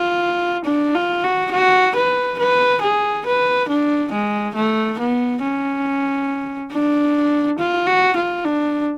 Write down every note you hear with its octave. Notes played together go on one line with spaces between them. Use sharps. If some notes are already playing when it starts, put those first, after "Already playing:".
Already playing: F4
D4
F4
F#4
F#4
B4
B4
G#4
B4
D4
G#3
A3
B3
C#4
D4
F4
F#4
F4
D4